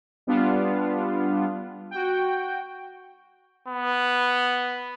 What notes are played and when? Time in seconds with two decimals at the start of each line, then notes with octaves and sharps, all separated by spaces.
0.27 G3 B3 D4 F4
1.91 F#4 G5
3.68 B3